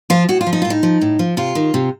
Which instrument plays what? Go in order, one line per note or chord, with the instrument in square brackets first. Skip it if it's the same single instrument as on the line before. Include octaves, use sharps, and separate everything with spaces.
[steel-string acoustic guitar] F3 F4
A2 F#4
F4
F3
D#4
A2 F4
D#4
F3
A2
F3
C3 F4
D#3
C3